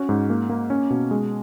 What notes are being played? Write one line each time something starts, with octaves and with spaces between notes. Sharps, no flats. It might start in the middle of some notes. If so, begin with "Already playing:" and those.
Already playing: C#4 F#4
G#2
A#3
A#3
C#4
B2
G#3